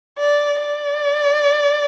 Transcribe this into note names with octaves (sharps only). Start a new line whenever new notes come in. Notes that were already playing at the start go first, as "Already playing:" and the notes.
D5
D5